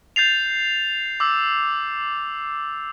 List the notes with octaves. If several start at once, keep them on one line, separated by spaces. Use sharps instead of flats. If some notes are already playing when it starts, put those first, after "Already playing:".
G6 A6 C7 F7
D6 E6